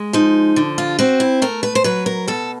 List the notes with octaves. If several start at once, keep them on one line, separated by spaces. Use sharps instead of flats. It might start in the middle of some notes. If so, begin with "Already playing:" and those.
Already playing: G#3
F3 D#4
D3
F4
C4 F#4
E4
A3 A#4
B4
C5
F#3 B4
A#4
B2 A4